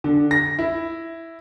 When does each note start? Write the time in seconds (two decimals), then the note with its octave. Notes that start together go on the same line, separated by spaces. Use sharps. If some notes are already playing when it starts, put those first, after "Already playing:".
0.04 D3
0.31 A#6
0.59 E4